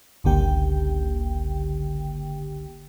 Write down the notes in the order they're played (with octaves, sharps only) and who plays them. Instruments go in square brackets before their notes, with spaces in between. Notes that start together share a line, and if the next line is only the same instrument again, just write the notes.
[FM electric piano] G1 C#2 D3 A#3 G4 G5